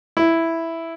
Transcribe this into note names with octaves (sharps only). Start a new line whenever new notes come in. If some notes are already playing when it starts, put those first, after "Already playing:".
E4